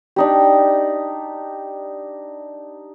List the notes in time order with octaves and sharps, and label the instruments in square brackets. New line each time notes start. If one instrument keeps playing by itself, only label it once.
[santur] D4 D#4 G4